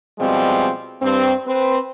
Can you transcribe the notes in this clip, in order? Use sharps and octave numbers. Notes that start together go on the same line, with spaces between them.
B2 F3 G3 G#3 C4
G2 C4
C4 B4